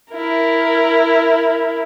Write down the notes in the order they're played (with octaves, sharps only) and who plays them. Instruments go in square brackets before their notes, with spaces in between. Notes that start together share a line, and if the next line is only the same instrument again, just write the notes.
[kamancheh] E4 A#4